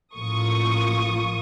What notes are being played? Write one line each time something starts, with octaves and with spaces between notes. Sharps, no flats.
A1 F3 A#3 F4 C#6 D#6